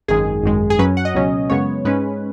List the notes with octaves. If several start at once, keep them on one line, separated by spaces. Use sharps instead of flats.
G#1 F#2 D#3 G#3 G#4
G#1 F#2 D#3 G#3
G#4
F#2 F#3 C#4 B4
F#5
D#5
C#2 B2 F#3 C#4
F#2 C#3 G#3 B3 C#5
G#2 G#3 C#4 B4